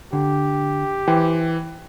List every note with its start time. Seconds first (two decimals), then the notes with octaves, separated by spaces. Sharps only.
0.13 D3 G4
1.08 E3 C5 G5